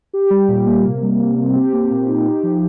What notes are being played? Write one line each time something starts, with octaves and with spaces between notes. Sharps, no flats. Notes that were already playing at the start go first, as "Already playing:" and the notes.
G4
G3
A#2
A#3
C3
G3
C3
C4
G4
A#3
A#2
D#4
G4
F3